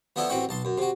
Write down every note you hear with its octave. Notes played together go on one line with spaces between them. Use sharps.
F3 B3 D4 E4 A4
A1 C4 F#4 B4 G5 C#6
B1 A5 C6
F#2
C3 F#4